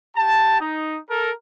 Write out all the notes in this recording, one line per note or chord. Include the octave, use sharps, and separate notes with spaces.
G4 A5
D#4
A4 A#4